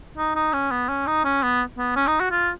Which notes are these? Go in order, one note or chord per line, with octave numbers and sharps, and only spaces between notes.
D#4
D#4
C#4
B3
C#4
D#4
C#4
B3
B3
C#4
D#4
F#4
F4